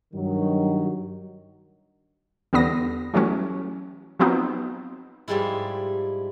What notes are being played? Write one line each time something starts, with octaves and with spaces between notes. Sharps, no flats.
G2 D#3 F#3
E2 D3 G3 B3 D#6 A#6
E3 F#3 G3 A3 C#4
F3 F#3 B3 C4 D#4 F#4
G#2 F3 G3 G#3 E4